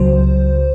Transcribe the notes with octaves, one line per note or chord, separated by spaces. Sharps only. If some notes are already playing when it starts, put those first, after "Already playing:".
Already playing: C#2 C#3 F#3 C5